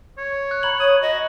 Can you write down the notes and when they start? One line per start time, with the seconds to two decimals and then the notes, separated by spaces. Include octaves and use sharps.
0.18 C#5
0.51 F#6 G#6
0.63 A#5 B5 F#7
0.80 C#5 D#6
1.02 F#4 D#5